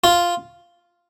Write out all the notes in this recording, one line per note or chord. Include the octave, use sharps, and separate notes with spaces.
F4